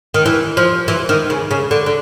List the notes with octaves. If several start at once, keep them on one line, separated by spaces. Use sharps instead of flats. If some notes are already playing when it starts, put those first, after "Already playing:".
D#3
E3
F3
E3
D#3
C#3
C#3
D3
D3